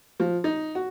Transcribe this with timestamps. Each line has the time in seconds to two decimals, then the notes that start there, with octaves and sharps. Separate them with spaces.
0.20 F3
0.44 D#4
0.75 F#4